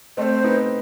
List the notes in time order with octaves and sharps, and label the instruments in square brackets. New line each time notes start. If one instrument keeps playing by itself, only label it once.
[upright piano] A3 C4 [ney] C5 D#5
[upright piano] B3 D#4